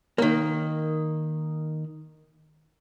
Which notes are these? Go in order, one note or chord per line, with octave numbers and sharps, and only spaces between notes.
D#3 A#3